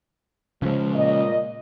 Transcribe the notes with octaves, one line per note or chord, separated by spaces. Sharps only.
C#3 F3 G#3
A#2 D#5